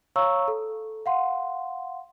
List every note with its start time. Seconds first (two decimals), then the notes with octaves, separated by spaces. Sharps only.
0.16 C#5 F5 A#5 C#6 E6
0.48 A4
1.06 F5 F#5 C6